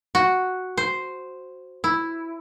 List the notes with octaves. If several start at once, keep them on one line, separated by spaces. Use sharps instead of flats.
F#4
C5
E4